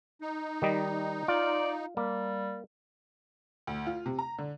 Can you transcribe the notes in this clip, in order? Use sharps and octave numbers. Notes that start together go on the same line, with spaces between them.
D#4
D#3 G3 D#5
F4 D5
G3 A#3
D2
F4
C3
A#5
D3